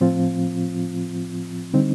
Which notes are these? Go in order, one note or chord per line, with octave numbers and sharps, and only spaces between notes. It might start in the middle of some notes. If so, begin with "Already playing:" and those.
A2 F3 C4 F4
D3 G3 C4 D#4